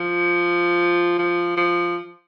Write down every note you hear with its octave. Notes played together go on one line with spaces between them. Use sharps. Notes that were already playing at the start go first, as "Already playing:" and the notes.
Already playing: F3
F3
F3